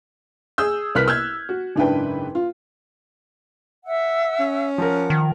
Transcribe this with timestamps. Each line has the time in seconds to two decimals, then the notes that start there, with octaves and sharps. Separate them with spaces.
0.58 G#4 D#6 E6 G6
0.95 C2 A#4 B4 F6 F#6 B6
1.08 E6 F6 G6 G#6
1.49 F#4
1.76 F#1 G#2 D4 E4 B4 G5
2.35 F4
3.84 E5 F#5 E6
4.40 C#4
4.78 F3 A#4 F#5 D6
5.10 D#3